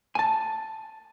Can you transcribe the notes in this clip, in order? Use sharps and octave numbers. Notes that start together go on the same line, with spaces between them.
G#5 A5